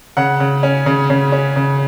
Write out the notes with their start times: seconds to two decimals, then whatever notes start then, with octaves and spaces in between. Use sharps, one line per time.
0.17 C#3 F#5
0.40 C#3
0.63 C#4
0.86 C#3
1.10 C#3
1.32 C#4
1.56 C#3